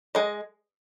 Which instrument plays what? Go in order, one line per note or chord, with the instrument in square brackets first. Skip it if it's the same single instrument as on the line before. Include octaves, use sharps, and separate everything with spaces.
[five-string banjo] G#3 D#5